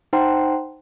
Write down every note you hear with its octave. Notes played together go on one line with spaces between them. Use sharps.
D#4 C5 F#5 G5 A#5 C6